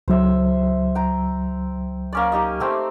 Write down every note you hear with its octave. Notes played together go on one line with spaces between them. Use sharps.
C#2 F#3 C5 E5
G5 A#5
A#3 C#4 D5
D#4 G4 D#5
A3 C4 G5